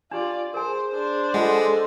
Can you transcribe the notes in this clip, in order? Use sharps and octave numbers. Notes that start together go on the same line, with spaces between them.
D4 F4 G4 D5
G#4 A#4 C5 G#5
D4 C5
G#3 F4 A4 F#5